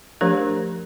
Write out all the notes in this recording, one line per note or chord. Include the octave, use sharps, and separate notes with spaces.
F3 A3 D4 G4 A#4 C5